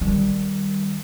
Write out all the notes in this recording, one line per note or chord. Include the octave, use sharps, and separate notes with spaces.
D#3 G3